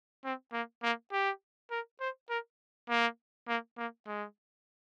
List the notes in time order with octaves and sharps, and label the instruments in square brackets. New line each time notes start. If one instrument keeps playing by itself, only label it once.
[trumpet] C4
A#3
A#3
G4
A#4
C5
A#4
A#3
A#3
A#3
G#3